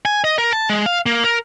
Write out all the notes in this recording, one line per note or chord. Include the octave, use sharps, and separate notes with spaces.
G#5
D#5
A#4
A5
G#3
F5
A#3
A#4